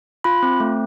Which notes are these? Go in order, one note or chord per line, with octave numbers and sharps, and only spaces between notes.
F4 B5
C4
A3